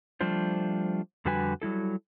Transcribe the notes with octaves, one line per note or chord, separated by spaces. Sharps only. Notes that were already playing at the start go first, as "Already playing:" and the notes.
F3 G3 A3 D4 F4 C5
F2 D3 G3 F#4 B4 G#5
F#3 G3 E4 A4